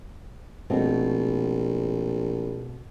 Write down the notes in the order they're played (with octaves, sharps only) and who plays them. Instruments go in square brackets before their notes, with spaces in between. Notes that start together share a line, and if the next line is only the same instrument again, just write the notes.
[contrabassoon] A#1 [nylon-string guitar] B2 A3 C4